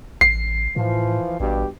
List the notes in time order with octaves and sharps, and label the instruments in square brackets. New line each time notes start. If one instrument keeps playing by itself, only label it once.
[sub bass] A1 [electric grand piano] C7
[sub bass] A2 [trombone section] E3 F3
[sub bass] A1 [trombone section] G2 B2 G4